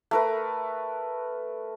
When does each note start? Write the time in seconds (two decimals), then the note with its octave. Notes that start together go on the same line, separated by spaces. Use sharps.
0.11 A3 A#4 B4